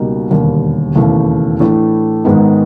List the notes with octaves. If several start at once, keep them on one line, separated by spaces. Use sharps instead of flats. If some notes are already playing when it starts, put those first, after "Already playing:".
Already playing: C#2 B2 G3 A#3 D#4
E1 D#2 D3 G3 A#3
E1 D#2 C#3 E3 A3
A2 E3 A3 D4
G#2 D#3 G#3 B3 D#4